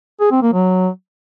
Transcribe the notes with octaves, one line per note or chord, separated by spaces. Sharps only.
G#4
C4
A#3
F#3